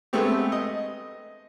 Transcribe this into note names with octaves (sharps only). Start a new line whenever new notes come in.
G#3 A3 B3 C4 G4
D#5